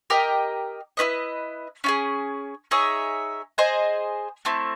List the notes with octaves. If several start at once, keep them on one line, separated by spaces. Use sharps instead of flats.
G4 A#4 D#5 G5
E4 G4 B4 D#5
C#4 F4 G#4
D#4 G#4 C#5 E5
G#4 C5 D#5 G#5
A3 C4 E4